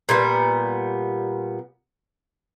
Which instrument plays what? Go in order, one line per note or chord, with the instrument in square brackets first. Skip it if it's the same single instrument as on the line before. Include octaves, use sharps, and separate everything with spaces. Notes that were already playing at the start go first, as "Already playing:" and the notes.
[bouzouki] A#2 G3 B3